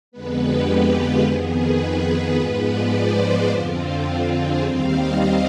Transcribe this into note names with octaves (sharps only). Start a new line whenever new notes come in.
F2 D3 G#3 B3 B4
G4
F4
F2 D#3 B3 G#4
B4
G#2 F3 G#3 B3
D5
C5
C5
F2 D3 F3 C4 F4
G#4
D#2 D#3 G3 C4 F5
D#5